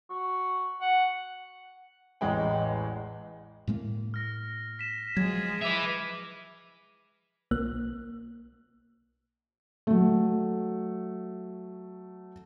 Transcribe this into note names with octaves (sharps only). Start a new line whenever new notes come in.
F#4
F#5
A1 E2 G#3 D#5 G5
A2 G#3 A#3
F6 A#6
B6 E7
F3 F#3 G#3 G#6
B4 E5 D6 D#7 F7
B1 A#3 F#6
F#3 A3